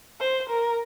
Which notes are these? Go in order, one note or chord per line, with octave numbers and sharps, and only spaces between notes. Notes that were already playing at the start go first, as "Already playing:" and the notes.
C5
A#4